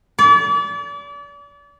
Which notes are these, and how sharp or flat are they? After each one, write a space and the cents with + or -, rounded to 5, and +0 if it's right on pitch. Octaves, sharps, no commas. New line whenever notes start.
D5 -35